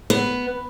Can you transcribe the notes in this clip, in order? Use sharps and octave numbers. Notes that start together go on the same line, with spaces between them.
B3